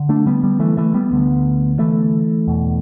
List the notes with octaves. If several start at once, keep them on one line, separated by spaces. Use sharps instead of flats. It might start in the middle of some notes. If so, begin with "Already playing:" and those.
Already playing: D3
A3 D4
G3 B3
G3 B3
E3 A3
E3 A3
G3 B3
D2 D3
E3 A3
E2 B2